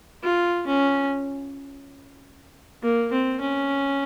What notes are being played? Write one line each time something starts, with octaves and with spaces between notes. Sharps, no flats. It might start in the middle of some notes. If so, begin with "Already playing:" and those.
F4
C#4
A#3
C4
C#4